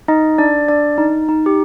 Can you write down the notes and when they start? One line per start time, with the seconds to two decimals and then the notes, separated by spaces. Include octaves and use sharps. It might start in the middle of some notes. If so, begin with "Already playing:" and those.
0.08 D#4 D#5
0.38 D4 D5
0.69 D4 D5
0.98 D#4
1.29 D#4
1.46 G4